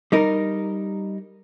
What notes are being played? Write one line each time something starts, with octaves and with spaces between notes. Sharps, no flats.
G3 D#4 A#4